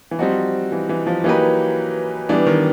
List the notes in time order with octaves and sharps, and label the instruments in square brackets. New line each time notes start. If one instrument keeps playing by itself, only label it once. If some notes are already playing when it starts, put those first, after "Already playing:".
[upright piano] E3
[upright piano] F3 [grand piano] G3 C4 D#4 F#4
[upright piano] E3
E3
F3
[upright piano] E3 [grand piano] F#3 A#3 D#4 G4 B4
[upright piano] E3 [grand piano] G3 B3 D4
[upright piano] D#3